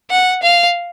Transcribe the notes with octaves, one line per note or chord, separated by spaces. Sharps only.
F#5
F5